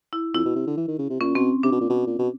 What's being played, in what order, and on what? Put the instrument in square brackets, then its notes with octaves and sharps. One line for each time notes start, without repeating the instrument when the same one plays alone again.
[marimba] E4
[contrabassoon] F2 [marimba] E4
[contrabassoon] B2
C3
D3
E3
D#3
C#3
C3
[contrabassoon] A#2 [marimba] C#4
[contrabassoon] B2 [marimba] C4
[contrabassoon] C3 [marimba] D4
[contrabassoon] B2
A#2
B2
A#2
B2